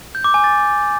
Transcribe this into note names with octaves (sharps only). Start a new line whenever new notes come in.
G6
D6
G#5
A6